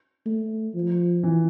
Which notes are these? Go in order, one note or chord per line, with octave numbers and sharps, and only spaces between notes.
A3
F3
E3